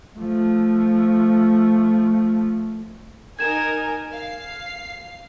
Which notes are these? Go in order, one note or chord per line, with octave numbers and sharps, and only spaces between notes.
F3 A3
D#4 A#4 G#5 G#6 E7
F5 C7